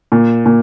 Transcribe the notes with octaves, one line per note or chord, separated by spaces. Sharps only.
A#2
A#2